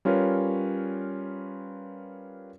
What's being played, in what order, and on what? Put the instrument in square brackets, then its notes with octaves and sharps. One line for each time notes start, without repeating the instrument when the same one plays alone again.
[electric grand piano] G3 C#4 F4 A#4 B4 C#5